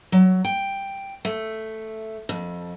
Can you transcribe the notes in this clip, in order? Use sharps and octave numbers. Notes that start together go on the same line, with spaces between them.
F#3
G5
A3
F2